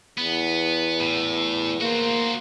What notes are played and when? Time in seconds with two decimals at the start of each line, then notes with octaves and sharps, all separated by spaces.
0.18 E2 B3
1.00 A2
1.81 A#3 F#4 C5